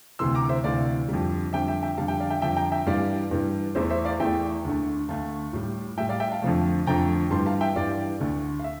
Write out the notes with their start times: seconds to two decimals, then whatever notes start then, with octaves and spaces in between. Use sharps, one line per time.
0.19 D2 C3 E3 C6 E6
0.35 A#5 D6
0.49 C5 E5
0.64 D2 C3 E3 D5 F5
1.09 F2 D3 G3
1.53 F2 D3 G3 E5 G5
1.68 E5 G5
1.83 E5 G5
1.97 F2 D3 G3 F5 A5
2.08 E5 G5
2.20 D5 F5
2.30 E5 G5
2.41 F2 D3 G3 E5 G5
2.57 G5 A#5
2.72 E5 G5
2.86 G2 E3 G3 D5 F5
3.31 G2 E3 G3
3.75 E2 E3 A3 C5 E5
3.90 C5 E5
4.05 D5 F5
4.20 E2 E3 A3 E5 G5
4.65 D2 D3 A3
5.09 D2 D3 A3 F5 A5
5.53 A2 G3
5.97 A2 G3 E5 G5
6.09 D5 F5
6.20 E5 G5
6.31 F5 A5
6.42 F2 D3 F3 A3
6.87 F2 D3 F3 A3 G5 A#5
7.31 G2 E3 G3 A5 C6
7.46 F5 A5
7.61 E5 G5
7.76 G2 E3 G3 D5 F5
8.20 D2 D3 A3
8.59 F5
8.64 E5